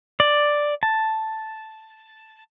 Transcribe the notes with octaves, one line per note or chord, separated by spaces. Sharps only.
D5
A5